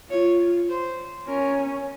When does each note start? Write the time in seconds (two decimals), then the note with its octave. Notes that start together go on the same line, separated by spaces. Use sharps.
0.10 F4 C#5
0.69 C5
1.27 C#4 A#4